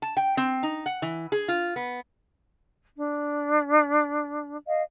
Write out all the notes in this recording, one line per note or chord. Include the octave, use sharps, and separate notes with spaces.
A5
G5
C4
D#4
F#5
E3
G#4
F4
B3
D4
D#5 F5